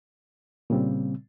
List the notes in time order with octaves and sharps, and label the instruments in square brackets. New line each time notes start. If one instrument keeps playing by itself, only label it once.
[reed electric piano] A#2 C#3 G3 C4